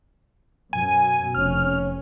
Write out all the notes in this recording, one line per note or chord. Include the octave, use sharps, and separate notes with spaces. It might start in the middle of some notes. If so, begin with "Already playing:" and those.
F#2 B2 G#5
F1 C#4 F6